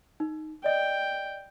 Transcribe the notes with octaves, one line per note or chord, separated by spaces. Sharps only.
D#4
D5 D#5 G5